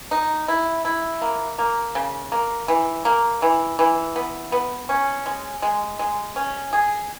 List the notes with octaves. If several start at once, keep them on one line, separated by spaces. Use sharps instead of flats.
D#4
E4
E4
A#3
A#3
C#3
A#3
E3
A#3
E3
E3
B3
B3
C#4
G#3
G#3
G#3
C#4
G#4